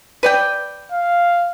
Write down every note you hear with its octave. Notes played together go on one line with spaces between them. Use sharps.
B4 D5 G5
F5